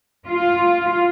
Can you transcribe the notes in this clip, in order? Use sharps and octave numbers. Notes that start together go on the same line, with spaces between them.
F4